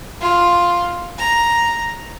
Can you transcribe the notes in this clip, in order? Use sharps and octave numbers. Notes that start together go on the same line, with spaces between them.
F4
A#5